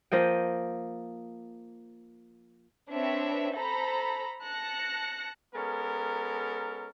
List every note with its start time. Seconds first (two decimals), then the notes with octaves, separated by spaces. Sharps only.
0.12 F3 A#3 D#5 G5
2.92 C4 D4 B4 C#5 E5
3.54 A4 C5 A#5 B5
4.43 A5 F#6 A#6 C#7
5.54 G#3 B3 C#4 A4 A#4